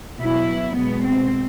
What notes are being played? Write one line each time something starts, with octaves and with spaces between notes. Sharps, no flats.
B2 F#3 E4
B2 G#3 B3
C4